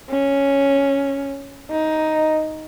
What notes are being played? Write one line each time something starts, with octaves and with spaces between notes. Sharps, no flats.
C#4
D#4